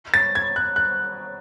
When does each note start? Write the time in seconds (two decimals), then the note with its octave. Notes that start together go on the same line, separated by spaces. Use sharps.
0.14 A6
0.35 G#6
0.56 F#6
0.76 F#6